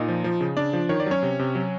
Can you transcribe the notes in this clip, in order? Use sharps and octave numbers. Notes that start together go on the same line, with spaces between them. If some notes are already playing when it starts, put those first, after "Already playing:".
Already playing: A#2 D#4 D#5
F3
F3
C#3
C#3 D4 D5
F3
D#3 C#5
D5
F#3 C#4 C#5
C3
C3
F#3